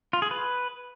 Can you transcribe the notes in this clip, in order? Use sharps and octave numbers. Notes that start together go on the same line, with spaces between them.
F4
G#4
B4